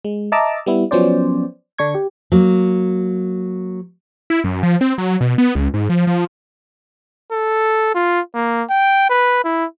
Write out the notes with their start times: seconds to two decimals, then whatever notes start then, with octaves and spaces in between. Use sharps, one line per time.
0.05 G#3
0.32 D#5 E5 A5 A#5 D6 E6
0.66 G3 B3 E4
0.91 F3 F#3 B3 C#4 C5 D5
1.78 D3 D4 C#6 G#6
1.95 G4
2.32 F#3 A#3
4.30 E4
4.44 F#2
4.63 F3
4.81 C4
4.98 F#3
5.21 B2
5.38 B3
5.55 C#2
5.74 G#2
5.90 F3
6.07 F3
7.32 A4
7.95 F4
8.35 A#3
8.70 G5
9.10 B4
9.45 E4